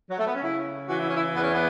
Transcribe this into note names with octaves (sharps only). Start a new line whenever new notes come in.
F#3
A3
B3
C#4
C#3 E4
E3 F#4
E4
C#4
E4
E2 B3
C#4
B3